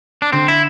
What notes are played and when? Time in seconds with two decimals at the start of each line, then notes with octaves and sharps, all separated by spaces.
0.22 D4
0.32 D3 C4
0.48 E4